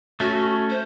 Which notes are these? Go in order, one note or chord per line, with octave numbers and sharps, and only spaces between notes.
A3 C#4 F#4
C5